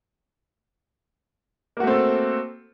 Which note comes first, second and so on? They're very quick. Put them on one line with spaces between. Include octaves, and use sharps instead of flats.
A#3 F#4 A3 C4 A4